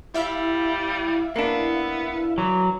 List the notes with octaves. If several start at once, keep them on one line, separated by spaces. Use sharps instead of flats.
G3 E4 E5 F5
A#3 B3 D4
E3 F#3